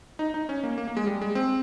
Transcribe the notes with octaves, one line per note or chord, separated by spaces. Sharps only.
D#4
D#4
C#4
A#3
A#3
A#3
G#3
G3
G#3
C4